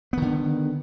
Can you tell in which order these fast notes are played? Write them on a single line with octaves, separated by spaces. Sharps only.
B3 D#3 D3